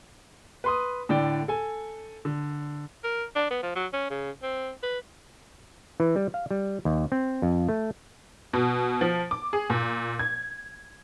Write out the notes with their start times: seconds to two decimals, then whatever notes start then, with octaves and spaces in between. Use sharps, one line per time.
0.64 B4 C6 D#6
1.09 A2 D3 D5 G5
1.48 A4 G#5
2.25 D3
3.04 A#4
3.36 D4
3.51 B3
3.63 F3
3.75 F#3
3.93 C#4
4.10 C#3
4.43 C4
4.83 B4
6.00 E3
6.16 G3
6.34 F5
6.51 G3
6.85 D#2
7.12 C4
7.42 F2
7.69 A3
8.53 B2
9.01 F3
9.31 D6
9.53 G#4
9.70 A#2
10.19 G#6